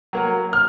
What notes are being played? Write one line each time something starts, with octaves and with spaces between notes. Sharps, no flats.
F#3 A#3
F6